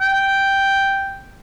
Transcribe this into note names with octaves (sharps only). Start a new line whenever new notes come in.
G5